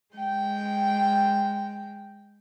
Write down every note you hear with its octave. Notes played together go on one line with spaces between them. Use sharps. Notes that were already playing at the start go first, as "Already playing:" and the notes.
G#3 G5